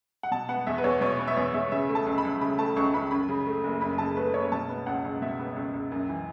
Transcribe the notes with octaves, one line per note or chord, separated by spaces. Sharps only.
F#5
B2 A5
B3 F#5
E2 E5
B4
E2 C#5
B2 C#5
B3
E5
E2 C#5
E2 E5
C#3 E5
A3
A5
C#2
B5
C#2
C#3 B5
A3 A5
C#2 C#6
C#2 B5
F#2 B5
C#3
A3
F#1
F#2 B5
C#3 A5
A3 B4
F#1 C#5
B2 A5
B3
C#2 F#5
C#2
B2 E5
B3
C#2
C#2
F#2
E3